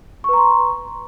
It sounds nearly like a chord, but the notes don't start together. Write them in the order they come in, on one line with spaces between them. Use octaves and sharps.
C#6 B4 A#5 C6